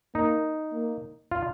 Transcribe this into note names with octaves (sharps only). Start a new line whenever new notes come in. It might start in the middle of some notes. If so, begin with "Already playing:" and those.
A#3 D#4
A#3
F4